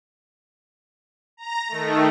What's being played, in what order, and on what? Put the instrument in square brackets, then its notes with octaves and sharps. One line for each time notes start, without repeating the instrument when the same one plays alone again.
[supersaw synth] A#5 A#6
D#3 A3